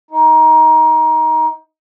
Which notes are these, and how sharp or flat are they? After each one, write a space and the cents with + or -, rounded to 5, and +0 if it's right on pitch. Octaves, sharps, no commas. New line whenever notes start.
D#4 +20